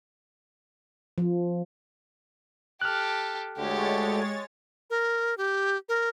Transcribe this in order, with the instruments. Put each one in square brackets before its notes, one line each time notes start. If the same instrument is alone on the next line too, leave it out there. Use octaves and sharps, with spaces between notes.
[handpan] F3
[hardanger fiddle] G4 A4 [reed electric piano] F6 F#6
[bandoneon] D2 D3 [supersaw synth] G#3 C#5 A6 [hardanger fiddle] G4
[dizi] A#4
G4
A#4